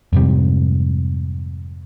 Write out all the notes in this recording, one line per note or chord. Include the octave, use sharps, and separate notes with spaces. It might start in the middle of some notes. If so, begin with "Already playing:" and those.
F2 G#2 C3 G3